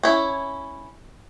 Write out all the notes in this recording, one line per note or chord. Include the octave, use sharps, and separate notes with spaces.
C#4 E4